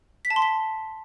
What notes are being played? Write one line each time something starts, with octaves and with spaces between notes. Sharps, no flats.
B6
A5
C6
B6